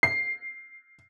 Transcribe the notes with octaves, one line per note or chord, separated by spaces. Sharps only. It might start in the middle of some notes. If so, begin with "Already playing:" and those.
C7